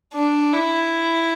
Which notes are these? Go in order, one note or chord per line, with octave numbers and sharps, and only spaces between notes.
D4
E4